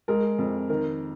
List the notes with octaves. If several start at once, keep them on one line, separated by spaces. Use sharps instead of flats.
G#3 A#4
F2
D#3 A#4